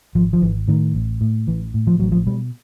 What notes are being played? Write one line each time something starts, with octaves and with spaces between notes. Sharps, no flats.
G#1 F3
F3
G#1 E3
A2 D#3
A1
A2
A1 E3
A2
F3
A1 F#3
F3
B2 G3